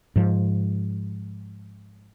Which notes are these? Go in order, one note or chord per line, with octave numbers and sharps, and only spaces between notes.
G#2 F3